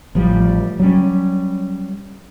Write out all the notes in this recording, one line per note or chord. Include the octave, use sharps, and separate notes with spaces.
A1 F3 G3
F#3 G3 C#4